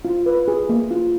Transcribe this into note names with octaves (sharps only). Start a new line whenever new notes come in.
F4
B4
G#4
A#3
F4